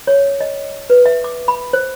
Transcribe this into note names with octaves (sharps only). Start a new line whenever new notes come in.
C#5
D#5
B4
E5
D6
B5
C5